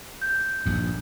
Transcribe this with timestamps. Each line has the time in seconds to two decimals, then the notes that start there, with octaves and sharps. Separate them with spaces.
0.21 G6
0.66 A#1 G2